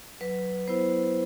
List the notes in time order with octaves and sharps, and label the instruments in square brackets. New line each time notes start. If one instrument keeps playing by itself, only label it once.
[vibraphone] F#3 B4
B3 E4 C5